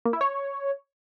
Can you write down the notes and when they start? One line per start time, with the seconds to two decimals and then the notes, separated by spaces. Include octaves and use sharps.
0.05 A#3
0.13 E4
0.21 C#5